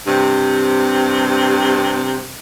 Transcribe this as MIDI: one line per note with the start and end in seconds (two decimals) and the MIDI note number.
0.07 2.31 43
0.07 2.31 48